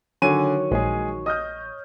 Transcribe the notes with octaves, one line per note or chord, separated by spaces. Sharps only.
D3 D#3 F#3 C#5 G#5 D#7
A#1 G#3 G#4
D#5 D#6 F6 G6